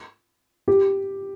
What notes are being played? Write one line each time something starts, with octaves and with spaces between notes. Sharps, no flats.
G4